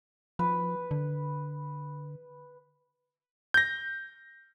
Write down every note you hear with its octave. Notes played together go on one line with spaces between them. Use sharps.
F3 B4
D3
G6 A#6